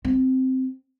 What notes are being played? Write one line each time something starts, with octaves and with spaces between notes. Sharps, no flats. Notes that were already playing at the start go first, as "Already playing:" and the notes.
C4